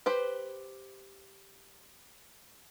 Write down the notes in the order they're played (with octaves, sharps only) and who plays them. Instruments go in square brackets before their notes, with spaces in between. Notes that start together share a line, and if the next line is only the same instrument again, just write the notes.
[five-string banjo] G4 B4 C5